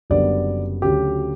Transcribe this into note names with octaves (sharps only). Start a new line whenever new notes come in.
F#1 F#2 D3 G3 B3 D5
D2 C#3 F#3 G4